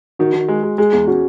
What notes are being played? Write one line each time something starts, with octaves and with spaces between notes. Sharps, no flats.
D#3 F#4
D#3
G#3
G#3
G#3 G#4
E2 G#4
C#4 F#4